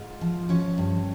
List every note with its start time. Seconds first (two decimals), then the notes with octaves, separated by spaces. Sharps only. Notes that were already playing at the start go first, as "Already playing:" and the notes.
Already playing: G#2 F4
0.21 F3
0.49 F3 C#4 C#5
0.78 G2